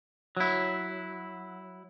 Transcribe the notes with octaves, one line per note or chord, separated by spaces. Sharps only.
F#3 E4